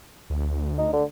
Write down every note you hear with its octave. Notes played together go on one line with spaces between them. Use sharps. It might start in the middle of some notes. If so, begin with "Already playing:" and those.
D2
D#4
D3